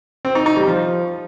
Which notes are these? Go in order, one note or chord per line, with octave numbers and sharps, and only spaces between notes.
C4
D#4
D#4
G3
F3